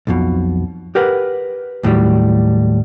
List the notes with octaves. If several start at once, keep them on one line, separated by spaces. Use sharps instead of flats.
B1 F2 B2
G4 A#4 B4 F#5
D#2 A2 F#3 G3